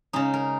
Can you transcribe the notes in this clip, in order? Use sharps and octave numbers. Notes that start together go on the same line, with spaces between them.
C#3 G#3 C#4 D#4
A#4